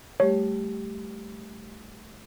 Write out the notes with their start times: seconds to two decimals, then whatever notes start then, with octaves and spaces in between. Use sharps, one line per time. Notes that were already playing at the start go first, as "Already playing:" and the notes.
0.20 G3 A3 G4 C#5